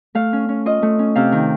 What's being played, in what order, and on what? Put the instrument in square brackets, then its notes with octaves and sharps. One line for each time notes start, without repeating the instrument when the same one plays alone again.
[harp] A3 F5
C#4
C#4
F4 D#5
A3
C#4
C3 F5
D#3